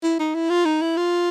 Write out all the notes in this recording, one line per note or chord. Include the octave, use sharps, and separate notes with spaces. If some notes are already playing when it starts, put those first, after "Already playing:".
E4
D#4
E4
F4
D#4
E4
F4